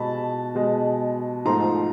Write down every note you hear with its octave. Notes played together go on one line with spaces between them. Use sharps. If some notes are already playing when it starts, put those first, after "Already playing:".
Already playing: B2 G#3 A5 B5
B2 G#3
G#2 F3 A3 A#5 C6